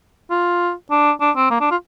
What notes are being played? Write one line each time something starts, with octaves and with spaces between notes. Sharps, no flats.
F4
D4
D4
C4
A#3
D4
F4